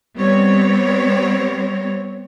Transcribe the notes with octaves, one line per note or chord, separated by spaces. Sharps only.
G3 B3 C4 C#5